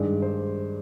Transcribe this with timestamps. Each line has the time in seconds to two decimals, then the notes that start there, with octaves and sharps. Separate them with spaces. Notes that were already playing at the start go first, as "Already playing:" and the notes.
Already playing: G2 D#3 G#3 D5
0.22 C5